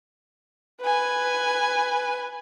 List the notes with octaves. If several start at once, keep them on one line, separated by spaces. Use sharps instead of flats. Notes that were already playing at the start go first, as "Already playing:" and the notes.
B4 G#5